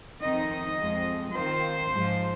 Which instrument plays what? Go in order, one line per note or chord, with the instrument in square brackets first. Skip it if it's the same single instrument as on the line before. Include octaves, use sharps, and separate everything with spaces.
[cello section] F2 D#3 C4 D#4 D#5
F2 F3 G#3 C4
D#3 C4 F4 C5
G#2 F3 G#3 F4